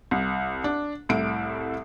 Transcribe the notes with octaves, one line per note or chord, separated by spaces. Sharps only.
C2
D4
C2 A2 E4 D7